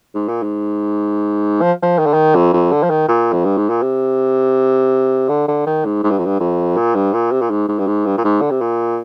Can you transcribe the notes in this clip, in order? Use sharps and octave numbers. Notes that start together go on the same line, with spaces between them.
G#2
A#2
G#2
F3
F3
D#3
D3
D#3
F2
F2
D3
F3
D#3
A#2
F2
G2
G#2
A#2
C3
D3
D3
D#3
G#2
G#2
G2
F2
G2
F2
A#2
G2
A#2
C3
A#2
G#2
G#2
G2
G#2
G2
A#2
G#2
D3
C3
A#2